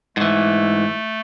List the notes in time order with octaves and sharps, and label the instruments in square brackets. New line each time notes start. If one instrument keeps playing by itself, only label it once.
[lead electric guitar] G#2 E3 [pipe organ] A3